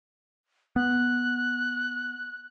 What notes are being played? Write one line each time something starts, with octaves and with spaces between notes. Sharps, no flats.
B3 F#6